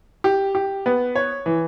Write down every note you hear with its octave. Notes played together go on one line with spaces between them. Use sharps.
G4
G4
B3
C#5
E3